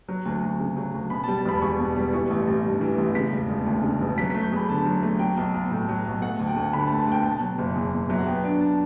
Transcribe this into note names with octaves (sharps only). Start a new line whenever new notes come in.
F#3
D2
D2
C#3
F#3
D2
B2 B5
A5
G3
A5
E1 B5
E2 C#6
B2
G3
E3 C#6
A1
A1
G2
E3
A1
C#3 B6
E1
E1
D2
C#3
E1
F#3 B6
A3 B6
G6
E2 B5
D3 A5
F#3
A3
F#3 G5
B1
B1
A2
F#3
B1
A3 F#5
D2
G5
D2
D3 B5
A5
A3
A5
D2 G5
B2 A5
F#3
F#1
E2
B2
F#3 E5
F#5
B3 G5
D4
A5